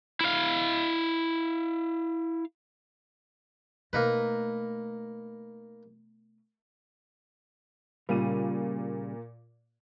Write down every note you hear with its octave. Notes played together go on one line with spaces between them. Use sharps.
E4 F5
B2 A3 A#3 D#4 B4
A#2 C#3 G3 D#7